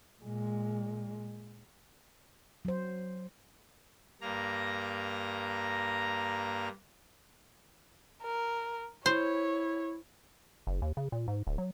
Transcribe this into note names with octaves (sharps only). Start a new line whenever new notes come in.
A#2 G#3
F#3 C5
G2 A#3 A#5
A#4
E4 C5 C#5
F#1
D#2
C#3
A#2
G#2
D1
F#3